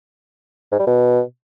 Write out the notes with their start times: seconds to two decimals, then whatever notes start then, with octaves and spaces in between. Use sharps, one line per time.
0.72 G#2
0.79 G3
0.87 B2